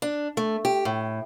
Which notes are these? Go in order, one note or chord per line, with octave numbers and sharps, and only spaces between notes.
D4
A3
G4
A2